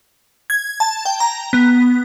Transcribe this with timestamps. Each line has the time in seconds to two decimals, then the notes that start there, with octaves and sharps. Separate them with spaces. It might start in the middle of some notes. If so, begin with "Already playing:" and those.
0.50 G#6
0.80 A5
1.05 G5
1.20 A#5
1.53 B3